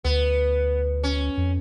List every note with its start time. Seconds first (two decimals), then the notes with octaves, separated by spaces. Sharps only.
0.04 D2 B3
1.03 C#4
1.37 F2